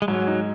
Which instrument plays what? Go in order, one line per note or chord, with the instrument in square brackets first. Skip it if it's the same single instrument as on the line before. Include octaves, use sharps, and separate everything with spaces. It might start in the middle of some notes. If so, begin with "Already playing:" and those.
[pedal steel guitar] G#3
[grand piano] G#2 [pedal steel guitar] F#3
[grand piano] D#4